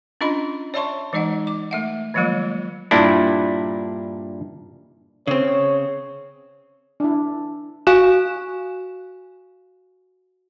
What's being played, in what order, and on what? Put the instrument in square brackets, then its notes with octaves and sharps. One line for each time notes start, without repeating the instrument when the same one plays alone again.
[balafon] C#4 D4 F4 D#5 B5 C6
C#5 D5 E5 A5 C6 C#6
E3 G#3 D#4 D#5 F#5
D6
A3 E5 F#5
D#3 F3 F#3 G#3 A#3 F4
[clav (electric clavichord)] G2 A#2 D4 E4
[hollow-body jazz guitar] C#3 C4 [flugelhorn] C#5
[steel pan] D4 E4
[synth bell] F#4 F5 G#5 C#6 F#6 E7